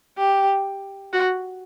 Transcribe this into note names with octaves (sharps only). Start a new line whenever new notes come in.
G4
F#4